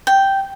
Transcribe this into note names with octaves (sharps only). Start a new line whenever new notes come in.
G5